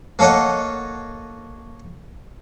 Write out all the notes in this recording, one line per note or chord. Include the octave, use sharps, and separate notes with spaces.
A#3 A4 C#5 D#5 F#5